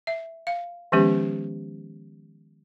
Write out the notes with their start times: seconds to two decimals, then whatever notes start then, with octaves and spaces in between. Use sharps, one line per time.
0.07 E5
0.47 F5
0.92 D#3 F3 G#3 B3 C#4 G4